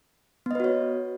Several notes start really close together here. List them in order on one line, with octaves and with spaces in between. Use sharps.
B3 D#5 B4 F#4 C#5